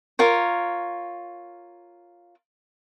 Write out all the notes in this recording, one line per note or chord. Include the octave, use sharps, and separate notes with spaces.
F4 A#4 C#5